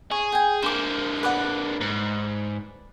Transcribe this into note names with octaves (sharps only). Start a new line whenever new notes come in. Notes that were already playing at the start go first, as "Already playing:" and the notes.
G#4 C#5
G5 G#5
D3 A#3 C5 D6
B4 D5 F#5
G#2